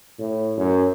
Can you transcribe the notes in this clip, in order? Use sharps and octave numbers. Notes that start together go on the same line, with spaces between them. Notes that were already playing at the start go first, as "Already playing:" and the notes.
A2
F#2